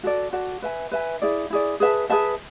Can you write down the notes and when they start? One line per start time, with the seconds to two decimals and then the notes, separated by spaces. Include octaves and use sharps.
0.03 F#4 A4 D5
0.33 F#4 A4 D5
0.62 B4 E5 G#5
0.92 B4 E5 G#5
1.22 E4 G#4 D5
1.50 E4 G#4 D5
1.80 G#4 B4 E5 A5
2.10 G#4 B4 E5 A5